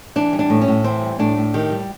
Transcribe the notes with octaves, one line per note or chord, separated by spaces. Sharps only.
E3 D4
G3
D4
A2
C#4
A2
E3 C4
G3
A2 D4
A2
D#3 G4
G3